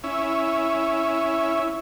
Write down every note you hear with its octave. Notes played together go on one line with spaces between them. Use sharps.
C#4 E4